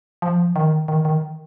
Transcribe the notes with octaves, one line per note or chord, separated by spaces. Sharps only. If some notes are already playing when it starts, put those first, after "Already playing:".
F3
D#3
D#3
D#3